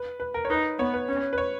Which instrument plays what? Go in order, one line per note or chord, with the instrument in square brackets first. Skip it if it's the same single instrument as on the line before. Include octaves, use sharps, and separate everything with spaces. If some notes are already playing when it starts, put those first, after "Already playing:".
Already playing: [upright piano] B4
B4
A#4
C#5
[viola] D#4 [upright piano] B4
[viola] B3 [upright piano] C#5
[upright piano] B4
[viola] C#4
[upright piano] B4
C#5